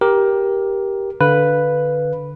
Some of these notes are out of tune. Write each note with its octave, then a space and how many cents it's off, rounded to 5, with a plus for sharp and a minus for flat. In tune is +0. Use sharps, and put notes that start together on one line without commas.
G4 +0 A#4 +15
D3 +0 B4 +0 F5 +0